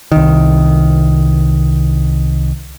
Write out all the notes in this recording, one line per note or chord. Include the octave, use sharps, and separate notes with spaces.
C2 D#3